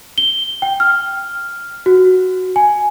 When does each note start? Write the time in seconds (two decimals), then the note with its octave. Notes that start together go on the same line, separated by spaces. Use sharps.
0.18 G7
0.62 G5
0.80 F6
1.86 F#4
2.56 G#5